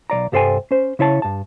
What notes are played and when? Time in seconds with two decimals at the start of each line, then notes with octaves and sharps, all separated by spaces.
0.10 B1 C#3 D5 A#5
0.32 C2 G2 A4 C5 G5 G#5
0.71 C#4 C5
0.99 C#3 E4 C#5 A5
1.22 G2 A5